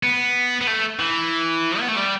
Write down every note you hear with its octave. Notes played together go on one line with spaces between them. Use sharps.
B3
B3
A3
E3
B3
A3
G3